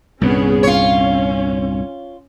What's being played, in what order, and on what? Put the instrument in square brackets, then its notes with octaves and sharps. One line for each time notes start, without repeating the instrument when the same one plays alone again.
[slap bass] C2 G2 A#2 [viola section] B3 C#4 G#4
[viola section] C#4 [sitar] F4 C#5